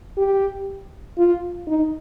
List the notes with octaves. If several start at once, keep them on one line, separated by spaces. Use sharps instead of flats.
G4
F4
D#4